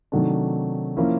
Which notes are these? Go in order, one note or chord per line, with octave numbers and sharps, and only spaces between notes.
C3 D#3 F#3 A3 D4
F3 A#3 C#4 E4